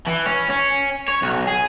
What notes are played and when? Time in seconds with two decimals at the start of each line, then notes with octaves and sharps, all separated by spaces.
0.07 E3
0.26 C#4
0.50 C#4
1.08 C#5
1.22 B1
1.47 G#4